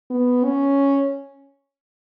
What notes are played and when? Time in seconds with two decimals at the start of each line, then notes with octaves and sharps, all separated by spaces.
0.10 B3
0.44 C#4